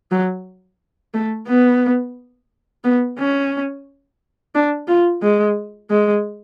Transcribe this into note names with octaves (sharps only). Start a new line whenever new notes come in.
F#3
A3
B3
B3
C#4
D4
F4
G#3
G#3